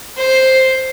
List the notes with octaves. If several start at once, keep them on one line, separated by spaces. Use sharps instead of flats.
C5